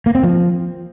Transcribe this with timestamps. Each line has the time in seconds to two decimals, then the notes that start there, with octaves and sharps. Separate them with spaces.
0.06 A#3
0.15 C4
0.23 F3